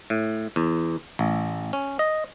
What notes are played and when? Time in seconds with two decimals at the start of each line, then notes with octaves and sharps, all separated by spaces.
0.10 A2
0.56 E2
1.19 A1
1.73 C#4
1.99 D#5